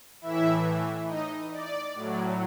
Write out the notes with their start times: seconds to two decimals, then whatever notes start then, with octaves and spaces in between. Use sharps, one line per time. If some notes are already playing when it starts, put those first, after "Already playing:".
0.21 A2 E3 E4 E5
1.08 D#4 D#5
1.52 D5
1.95 A2 F#3